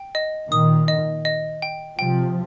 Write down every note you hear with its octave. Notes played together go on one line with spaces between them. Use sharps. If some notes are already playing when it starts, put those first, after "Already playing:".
Already playing: G5
D#5
A#2 D#3 D#6
D#5
D#5
G5
C3 F3 G5